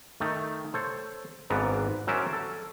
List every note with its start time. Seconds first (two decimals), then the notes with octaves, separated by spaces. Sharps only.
0.20 D#3 A3
0.74 A4 C5 C#5
1.50 G#1 G#2 B3 D4 A#5
2.07 F#3 C#4 A#4 C5 D5 E5
2.33 A4